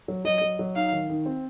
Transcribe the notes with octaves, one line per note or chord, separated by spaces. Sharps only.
F#3
F#3 D#5
F#3
F#3
D#4 F5
D#3
D#3
C4